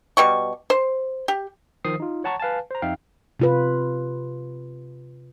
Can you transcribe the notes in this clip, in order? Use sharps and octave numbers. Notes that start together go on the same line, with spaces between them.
B2 G3 C#6
C5
G4
D#3 F3 C5 D#6 C7
D#4 F4
C#5 F#5 A5 A#5 C#6
B4 F5 G#5 A5
C5 A#5
F2 D#4 E5 F5 G5
C3 F4 B4